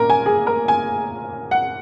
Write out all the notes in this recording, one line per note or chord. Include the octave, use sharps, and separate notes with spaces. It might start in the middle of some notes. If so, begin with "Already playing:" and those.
Already playing: A#2 A#3 C#4 A#4
G#5
G#4
A#4
G#5
F#5